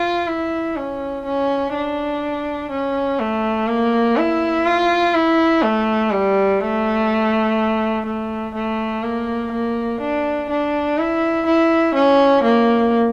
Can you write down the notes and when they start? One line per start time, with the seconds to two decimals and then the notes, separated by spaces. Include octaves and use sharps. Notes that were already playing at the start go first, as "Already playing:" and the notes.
Already playing: F4
0.28 E4
0.76 C#4
1.26 C#4
1.74 D4
2.70 C#4
3.20 A3
3.68 A#3
4.17 E4
4.66 F4
5.14 E4
5.63 A3
6.12 G3
6.60 A3
8.06 A3
8.55 A3
9.03 A#3
9.52 A#3
10.01 D4
10.50 D4
10.98 E4
11.46 E4
11.95 C#4
12.44 A#3